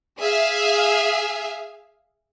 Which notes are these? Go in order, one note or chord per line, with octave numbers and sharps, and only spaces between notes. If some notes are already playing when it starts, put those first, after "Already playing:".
G#4 E5 F5